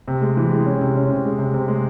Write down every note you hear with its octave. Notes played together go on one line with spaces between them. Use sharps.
C3
G#3
E3
G#3
C#4
C3
C#4
C3
G#3
C3
C3
G#3